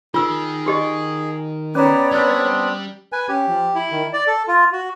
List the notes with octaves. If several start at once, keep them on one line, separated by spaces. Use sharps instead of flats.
D#3 F4 G#4 E6
F#4 G4 D#5
B3 C#4 G4 B4 C#5 D5 A#5
G3 B3 C4 D4
B4 G#5
C#4 G4
F3
E4
D#3
D5
A4
F4
F#4